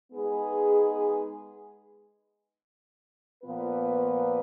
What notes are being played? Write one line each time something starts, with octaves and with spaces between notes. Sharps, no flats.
G#3 B3 D#4 G#4 B4
A#2 F3 B3 F4 B4